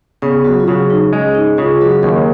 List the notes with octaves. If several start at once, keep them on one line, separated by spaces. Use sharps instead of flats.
C#3 B3
F#3 F#4
F4
C#3 F#3 F#4
D#4
G#3 C#4
D#4
C#3 F4
F#3 F#4
D#2 A#3 A#4